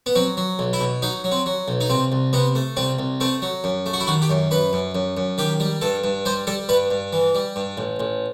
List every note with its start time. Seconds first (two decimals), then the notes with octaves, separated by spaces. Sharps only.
0.06 B3
0.15 F#3 C4
0.37 F#3
0.59 B1
0.73 E4
0.81 B2
1.02 F#3 D#4
1.24 F#3
1.32 C4
1.46 F#3
1.68 B1
1.81 D#4
1.90 C2 C4
2.12 C2
2.33 C3 B3
2.55 A3
2.77 C2 C4
2.99 C2
3.20 A3 C4
3.42 F#3
3.64 F#2
3.86 A3
3.93 F#4
4.00 E4
4.07 D#3 F#4
4.22 G4
4.30 F#2
4.51 F#2 B4
4.73 F#2
4.95 F#2
5.17 F#2
5.38 D#3 G4
5.60 G3
5.81 G2 A4
6.04 G2
6.25 G3 C5
6.47 G3 A4
6.69 G2 B4
6.90 G2
7.13 E3
7.35 G3
7.56 G2
7.78 A1
8.00 A1